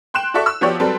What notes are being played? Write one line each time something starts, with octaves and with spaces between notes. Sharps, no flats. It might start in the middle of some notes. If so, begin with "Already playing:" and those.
G5 C6 F#6 E7
F#4 A4 D5 E5 C#6
E6
F3 B3 F#4 G4 C#5 D5
F#3 G3 C4 A4 B4